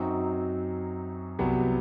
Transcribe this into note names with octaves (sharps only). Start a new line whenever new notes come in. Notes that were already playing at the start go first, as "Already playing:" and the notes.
Already playing: F#2 F#3 C4 D#4 F#4
C2 C3 F#3 B3